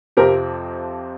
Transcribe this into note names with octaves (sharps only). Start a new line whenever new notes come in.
F2 C3 F3 C4 G4 A#4